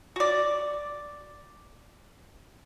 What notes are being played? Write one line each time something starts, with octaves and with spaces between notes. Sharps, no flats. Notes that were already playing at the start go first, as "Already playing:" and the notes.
F#4 D5